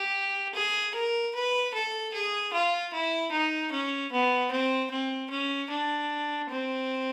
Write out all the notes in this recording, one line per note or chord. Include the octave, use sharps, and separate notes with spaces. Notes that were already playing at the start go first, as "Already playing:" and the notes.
Already playing: G4
G#4
A#4
B4
A4
G#4
F4
E4
D#4
C#4
B3
C4
C4
C#4
D4
C4